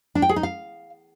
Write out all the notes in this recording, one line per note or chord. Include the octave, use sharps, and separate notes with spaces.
D4
G5
G#4
D#4
F5